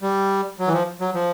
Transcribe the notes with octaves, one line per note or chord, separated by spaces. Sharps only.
G3
F#3
E3
F3
F#3
F3